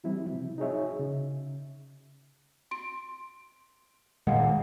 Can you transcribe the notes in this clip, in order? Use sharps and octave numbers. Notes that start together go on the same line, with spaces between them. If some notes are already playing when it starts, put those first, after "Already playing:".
E3 F#3 G3 C4 E4
C3 F3
D#4 F#4 G#4 C#5 E5
C#3
C6 D7
A#2 D#3 G#3 F5 F#5